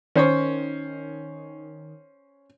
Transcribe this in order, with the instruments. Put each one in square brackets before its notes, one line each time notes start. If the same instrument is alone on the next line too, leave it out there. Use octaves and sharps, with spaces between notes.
[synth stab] D#3 [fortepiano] C#4 C5 C#5